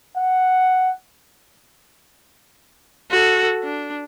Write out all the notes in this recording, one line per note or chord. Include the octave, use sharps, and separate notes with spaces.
F#5
F#4 A4
D4